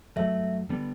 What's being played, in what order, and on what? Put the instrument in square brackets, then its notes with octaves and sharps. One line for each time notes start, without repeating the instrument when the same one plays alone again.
[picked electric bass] G2 F#3 A3 [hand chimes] E5
[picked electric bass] D3 G3 B3